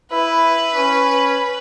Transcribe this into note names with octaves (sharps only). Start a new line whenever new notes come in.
E4 B4
C#4